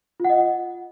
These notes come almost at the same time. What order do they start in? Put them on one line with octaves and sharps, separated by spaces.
F4 F#5 D#5